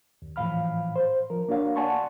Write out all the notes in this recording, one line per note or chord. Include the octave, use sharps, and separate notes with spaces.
D#2
A2 E3 F3 F5 B5 F6
C5
F3 A#4
A#3 D4 F#4 C#5 F5
D5 F#5 G#5 A5 C6 C#6